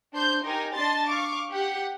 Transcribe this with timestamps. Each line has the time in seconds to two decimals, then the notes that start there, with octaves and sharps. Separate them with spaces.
0.13 D4 C5 C6 G6
0.43 D#4 G4 A#4 G#5
0.74 D4 D#5 A5 C6 A6
1.08 F5 C#6 D6
1.51 G4 F#5